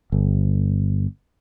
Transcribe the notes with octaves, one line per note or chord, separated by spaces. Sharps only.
G1